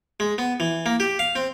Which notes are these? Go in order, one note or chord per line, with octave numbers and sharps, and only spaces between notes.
G#3
B3
E3
A#3
G4
F5
C4